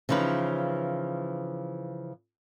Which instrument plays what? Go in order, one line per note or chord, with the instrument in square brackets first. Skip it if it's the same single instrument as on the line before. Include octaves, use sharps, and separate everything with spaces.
[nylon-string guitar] C#3 E3 F3 D#4 B4